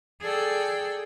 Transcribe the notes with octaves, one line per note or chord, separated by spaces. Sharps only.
G#4 A4 D5 G5